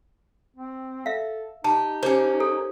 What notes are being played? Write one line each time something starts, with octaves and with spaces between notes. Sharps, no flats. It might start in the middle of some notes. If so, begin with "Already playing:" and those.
C4
A4 E5 F5
D#4 G4 A5
A#3 C#4 G4 C5
A4